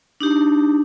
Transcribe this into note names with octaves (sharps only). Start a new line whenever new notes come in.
D4 D#4 G4